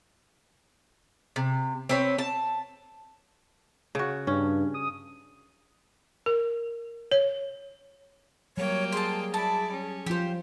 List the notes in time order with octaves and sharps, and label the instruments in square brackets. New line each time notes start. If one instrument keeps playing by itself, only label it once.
[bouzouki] C3
C4 B4 C#5
A5
[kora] C#3 F#4
[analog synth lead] G2 [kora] C#4
[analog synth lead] D#6
[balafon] A#4
C#5
[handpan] F#3 G3 [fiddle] A#3 G5 [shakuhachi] C#5
[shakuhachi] G#4 [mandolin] C5 A5
[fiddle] E4 D5 [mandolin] A5
[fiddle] C#4
[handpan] F3 F4 [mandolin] G4 C5